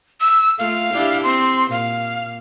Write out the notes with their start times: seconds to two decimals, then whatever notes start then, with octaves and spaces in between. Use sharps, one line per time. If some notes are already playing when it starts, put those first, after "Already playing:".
0.20 E6
0.59 A3 F4 F5
0.93 D4 E4 G4
1.23 C4 C6
1.71 A#2 F5